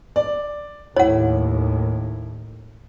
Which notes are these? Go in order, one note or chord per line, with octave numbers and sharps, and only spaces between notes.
D5
D#2 A2 E4 C#5 F#5